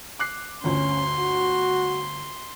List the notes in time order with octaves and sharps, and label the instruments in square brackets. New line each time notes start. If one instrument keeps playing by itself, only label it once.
[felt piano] D6 F#6 C7
[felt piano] G1 D2 [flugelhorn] C#4 [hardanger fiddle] C6
[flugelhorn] F#4